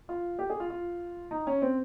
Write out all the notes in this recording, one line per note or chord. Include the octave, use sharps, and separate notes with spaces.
F4
G4
G#4
F4
F4
D#4
C#4
C4